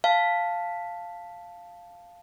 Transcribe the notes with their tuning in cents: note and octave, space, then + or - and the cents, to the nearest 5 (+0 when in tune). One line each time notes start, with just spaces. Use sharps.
F5 +0 A5 +0